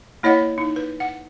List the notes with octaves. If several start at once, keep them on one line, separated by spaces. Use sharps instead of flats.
A#3 E4 C#5 D#5 F#5
D#4
B4
F#5